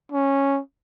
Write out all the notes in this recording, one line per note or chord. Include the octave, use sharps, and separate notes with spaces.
C#4